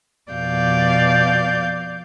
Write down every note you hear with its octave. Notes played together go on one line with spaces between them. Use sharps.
F2 B2 D5 F5 G6